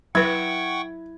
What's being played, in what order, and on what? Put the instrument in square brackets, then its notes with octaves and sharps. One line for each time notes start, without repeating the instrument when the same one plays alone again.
[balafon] F#3 B4 [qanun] E4 [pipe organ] F#5 G5 C#6 [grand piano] G#6